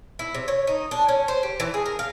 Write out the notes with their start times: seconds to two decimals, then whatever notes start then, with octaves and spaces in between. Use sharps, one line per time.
0.19 E4
0.34 C3
0.48 C#5
0.67 D#4
0.91 D4
1.09 C#4
1.28 C5
1.43 G4
1.60 E3
1.74 G#4
1.86 A#4
1.99 F5